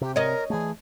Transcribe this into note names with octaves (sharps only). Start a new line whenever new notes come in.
C3 G4
A#4 C#5 D#5
E3 A3 G#4